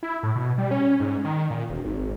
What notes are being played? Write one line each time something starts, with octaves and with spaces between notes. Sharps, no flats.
E4
A2
B2
G3
C#4
G#2
D#3
A#2
E1
G#1